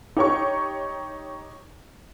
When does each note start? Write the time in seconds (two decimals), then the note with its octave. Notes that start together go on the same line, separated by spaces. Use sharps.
0.17 D#4 G4 C#5 C#6